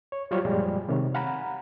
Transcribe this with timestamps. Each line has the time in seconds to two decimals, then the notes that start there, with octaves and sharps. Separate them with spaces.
0.12 C#5
0.31 F#3 G3 F4 G4 C5 C#5
0.45 F#2 A#2 F3 G3 G#3
0.89 C3 D#3 G#3 C#5
1.14 F5 F#5 G#5 A#5 B5